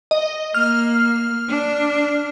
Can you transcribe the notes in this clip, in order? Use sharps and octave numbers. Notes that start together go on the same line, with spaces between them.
D#5
A#3 F6
D4